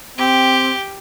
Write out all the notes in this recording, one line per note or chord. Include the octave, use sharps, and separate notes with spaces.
C4 G4